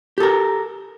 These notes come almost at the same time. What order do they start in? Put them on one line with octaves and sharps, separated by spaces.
G4 A4 A#4